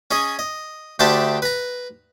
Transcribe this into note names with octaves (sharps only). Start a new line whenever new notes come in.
C#4 G#4 D#5
D#5
D2 D4 G4 C5 E5 A5
B4 A#5